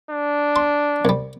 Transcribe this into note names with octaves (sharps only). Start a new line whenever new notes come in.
D4
C6
C2 G3